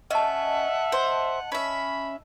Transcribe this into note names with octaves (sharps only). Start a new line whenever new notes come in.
C#4 D#5 E5 F#5 A5
C5
C#4 E5 B5